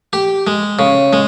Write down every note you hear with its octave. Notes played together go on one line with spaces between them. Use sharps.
G4
G#3
C#3
G#3